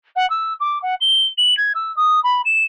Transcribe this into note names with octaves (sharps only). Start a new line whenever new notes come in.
F#5
E6
D6
F#5
G7
F#7
G#6
E6
D#6
B5
E7